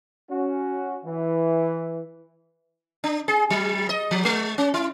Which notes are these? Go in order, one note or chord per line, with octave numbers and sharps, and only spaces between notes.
C#4 F#4
E3
D4
G#4
F#3
D#5
F3
G#3
C#4
E4